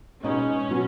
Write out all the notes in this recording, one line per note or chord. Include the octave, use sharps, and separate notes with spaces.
B2 G#3 B3 C#4 D#4 G#4
B2 F#3 B3